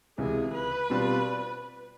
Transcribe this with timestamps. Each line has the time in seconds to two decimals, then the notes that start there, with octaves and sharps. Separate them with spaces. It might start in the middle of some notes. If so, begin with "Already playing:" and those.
0.18 C#2 C3 E3 G#4
0.54 B4
0.90 B2 G3 C4 F4